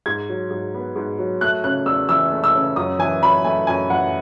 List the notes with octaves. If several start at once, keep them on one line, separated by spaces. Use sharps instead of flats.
G#2 G#6
F#3
G#2
B3
G#2
F#3
A3 F#6
C#3 F#6
E2 E6
E3 E6
A3
E6
C#3
F#2 D#6
E3 G#5
F#2 B5
A3 G#5
F#2 G#5
E3 F#5